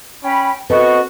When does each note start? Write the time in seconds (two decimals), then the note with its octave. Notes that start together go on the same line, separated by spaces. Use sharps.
0.24 C#4 G5 B5
0.70 B3 C4 F#4 A4 B4 D#5 C#6